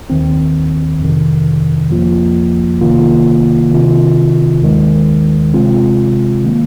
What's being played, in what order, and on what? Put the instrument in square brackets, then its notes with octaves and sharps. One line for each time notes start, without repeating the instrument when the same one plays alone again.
[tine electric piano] D#2 D#3 C4
F2 C3 D#3
F2 F3 A#3 F4
C2 C3 D#3 A#3 F4
C3 D#3 C4 F4
D#2 D#3 G#3
C3 G#3 C4 F4
D#3 A#3